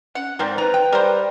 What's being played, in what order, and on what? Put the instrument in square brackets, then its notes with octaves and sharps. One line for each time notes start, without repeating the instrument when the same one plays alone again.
[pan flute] C#4 [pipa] F#5
[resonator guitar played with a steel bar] G#2 [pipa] C4 A#4 C5 [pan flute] D5
[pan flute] B4 [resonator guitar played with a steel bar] A#5
[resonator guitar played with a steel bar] G5
[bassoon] G3 [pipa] A#4 C5